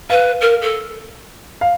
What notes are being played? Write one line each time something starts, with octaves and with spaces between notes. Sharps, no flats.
B4 F5
A#4
A4
F5